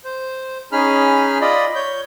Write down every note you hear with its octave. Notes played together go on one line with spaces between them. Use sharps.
C5
C#4 D#4 G#4 B5 F6
F4 D5 D#5 B5
C#5 G6